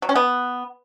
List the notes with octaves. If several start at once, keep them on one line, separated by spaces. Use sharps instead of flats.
F#3
C#4
B3